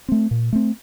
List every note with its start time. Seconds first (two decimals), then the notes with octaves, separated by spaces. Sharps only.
0.08 A3 C4
0.31 A#2
0.53 A3 C4